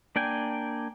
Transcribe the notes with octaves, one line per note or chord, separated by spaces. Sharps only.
A#3 D4 D5 G5 G#5